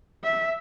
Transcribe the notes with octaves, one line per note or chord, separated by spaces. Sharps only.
E5